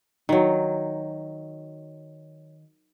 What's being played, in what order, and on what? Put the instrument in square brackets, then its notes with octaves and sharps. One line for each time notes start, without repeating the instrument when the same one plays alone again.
[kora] D#3 F#3